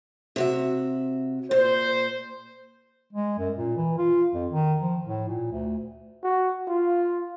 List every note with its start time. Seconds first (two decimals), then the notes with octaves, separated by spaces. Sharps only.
0.36 C3 F#4 E5
1.51 A#2 C5
3.13 G#3
3.38 F#2
3.57 A#2
3.77 E3
3.98 F4
4.33 F2
4.52 D#3
4.81 F3
5.04 A2
5.28 A#2
5.51 D2
6.23 F#4
6.68 F4